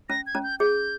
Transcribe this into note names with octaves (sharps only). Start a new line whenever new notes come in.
C#4 A#6
G#6
C#4
G6
G#4 G6